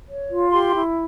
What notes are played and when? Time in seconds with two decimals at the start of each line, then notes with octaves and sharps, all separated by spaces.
0.09 C#5
0.30 F4
0.51 G4 C6
0.74 E4